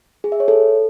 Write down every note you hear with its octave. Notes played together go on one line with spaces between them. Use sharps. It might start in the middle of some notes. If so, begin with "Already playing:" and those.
G#4
E5
C#5
A4